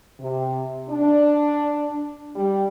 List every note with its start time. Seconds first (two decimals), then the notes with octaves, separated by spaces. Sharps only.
0.20 C3
0.90 D4
2.36 G3